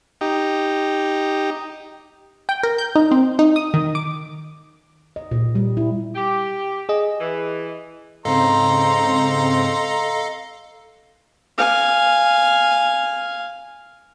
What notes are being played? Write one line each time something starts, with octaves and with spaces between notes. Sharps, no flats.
D#4 G4
G5
A#4
G6
D#4
C4
D#4
D#6
D#3
D6
D#5
A#2
G3
E4
G4
G#4 D#5
E3
G#2 C#3 C4 A4 D#5 F5 A#5 C6
F5 G#5